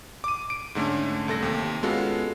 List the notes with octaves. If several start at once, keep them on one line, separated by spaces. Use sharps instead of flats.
D6 D#7
D7
G#2 D3 A3 C#4
C2 A4 A#6
D#2 C3
G#3 B3 C#4 F4 F#4 A4